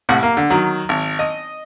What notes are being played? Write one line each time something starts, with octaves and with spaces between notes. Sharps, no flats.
C2 A2 F#5
A#3
D3
D#3 F#3
G#1
D#5